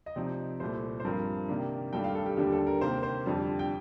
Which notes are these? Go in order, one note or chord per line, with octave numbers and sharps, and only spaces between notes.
D#5
C3 F3 C4 D#4 D5
C2 A#2 A3 C5
C5
G2 F3 C4 A#4
C3 D#3 A#3 D4
G2 D#3 A3 D4 G5
F5
A4
G4
D#2 D3 G3 D4 G4
A4
A#4
C3 D#3 A#3 C5
C5
F2 D3 G3
G5